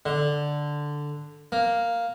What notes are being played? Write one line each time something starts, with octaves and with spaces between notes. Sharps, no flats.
D3
A#3